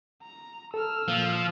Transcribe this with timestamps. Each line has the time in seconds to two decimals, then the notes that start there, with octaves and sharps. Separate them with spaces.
0.23 A#5
0.74 A4 E6 F6
1.08 A#2 F3